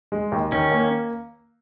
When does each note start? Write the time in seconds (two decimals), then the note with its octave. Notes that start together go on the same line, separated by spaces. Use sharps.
0.12 G#3
0.32 D#2
0.52 D#3 C#4
0.71 A#3